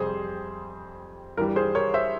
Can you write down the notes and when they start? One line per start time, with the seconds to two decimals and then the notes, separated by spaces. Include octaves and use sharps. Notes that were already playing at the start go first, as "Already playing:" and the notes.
Already playing: F2 C3 G3 G#4 C5
1.37 G2 E3 G3 A#4
1.56 G#4 C5
1.75 A#4 C#5
1.94 C5 E5